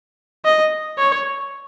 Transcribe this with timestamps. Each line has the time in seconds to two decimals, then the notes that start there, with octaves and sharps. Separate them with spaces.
0.45 D#5
0.98 C#5